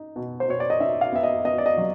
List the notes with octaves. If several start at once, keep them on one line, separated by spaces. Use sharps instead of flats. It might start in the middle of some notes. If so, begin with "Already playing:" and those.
Already playing: D#4
B2
C5
B2 C#5
D5
D#5
D#4 E5
F5
B3 E5
D#5
B3 D#5
D5
D#5
F#3